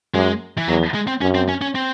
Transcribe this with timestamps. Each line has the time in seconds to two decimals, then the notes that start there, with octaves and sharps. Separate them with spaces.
0.14 F#2 G#3
0.58 E3
0.68 E2 F#3
0.94 G#3
1.08 C4
1.21 F#2 C#4
1.35 C4
1.48 C#4
1.62 C#4
1.75 C4